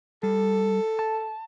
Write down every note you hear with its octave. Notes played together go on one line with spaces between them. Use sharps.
G3 A4
A5